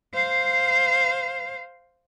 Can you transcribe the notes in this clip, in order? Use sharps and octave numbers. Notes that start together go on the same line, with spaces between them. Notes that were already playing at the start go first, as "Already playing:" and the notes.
C5 F5